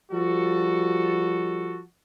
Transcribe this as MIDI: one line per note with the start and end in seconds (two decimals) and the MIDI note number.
0.12 1.80 53
0.12 1.80 55
0.12 1.80 66
0.12 1.80 69